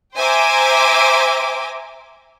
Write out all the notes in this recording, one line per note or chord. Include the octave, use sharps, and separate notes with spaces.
C5 E5 G5 G#5 A#5 D6